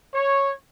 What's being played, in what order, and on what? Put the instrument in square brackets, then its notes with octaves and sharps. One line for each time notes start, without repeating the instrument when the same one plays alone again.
[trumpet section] C#5